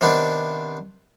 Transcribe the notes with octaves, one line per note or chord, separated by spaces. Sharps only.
C3 D#3 B3 C4 D4